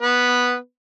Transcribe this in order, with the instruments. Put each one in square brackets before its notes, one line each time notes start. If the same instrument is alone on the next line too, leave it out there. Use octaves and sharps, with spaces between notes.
[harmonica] B3 B4